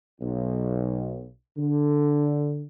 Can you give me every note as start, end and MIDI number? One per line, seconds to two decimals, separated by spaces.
0.21 1.28 35
1.57 2.65 50